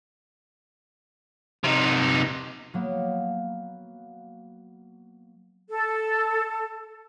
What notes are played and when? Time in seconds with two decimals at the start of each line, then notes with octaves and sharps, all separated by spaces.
1.64 C3 D#4
2.74 F#3 A#3 B3
5.69 A4